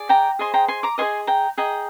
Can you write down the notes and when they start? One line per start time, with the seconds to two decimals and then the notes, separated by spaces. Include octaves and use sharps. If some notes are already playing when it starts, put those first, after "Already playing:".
Already playing: G#4 D5
0.09 G5 A#5
0.39 G#4 C5 D#5 G#5 C6
0.54 G5 A#5
0.68 G#5 C6
0.83 A#5 D6
0.98 G#4 C5 D#5 G#5 C6
1.27 G5 A#5
1.58 G#4 D#5 G5 A#5